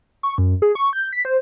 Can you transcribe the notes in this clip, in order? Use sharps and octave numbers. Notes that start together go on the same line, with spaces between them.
C#6
F#2
G#4
C#6
G6
B6
C5